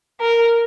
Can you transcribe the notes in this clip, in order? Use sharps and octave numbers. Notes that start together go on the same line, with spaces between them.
A#4